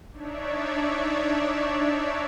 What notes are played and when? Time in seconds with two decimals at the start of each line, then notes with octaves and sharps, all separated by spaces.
0.11 D4 D#4 C#5 D5 E5